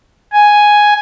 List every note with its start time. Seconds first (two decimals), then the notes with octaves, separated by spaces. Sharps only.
0.32 G#5